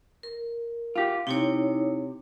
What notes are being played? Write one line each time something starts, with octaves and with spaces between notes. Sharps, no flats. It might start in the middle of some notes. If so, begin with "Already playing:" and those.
A#4
F4 G4
C3 D#4 E4 C#5